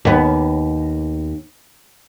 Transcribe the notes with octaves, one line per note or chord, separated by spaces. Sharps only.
D#2 B3